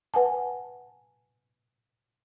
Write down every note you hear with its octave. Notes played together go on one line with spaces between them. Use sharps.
B4 F#5 G#5 A5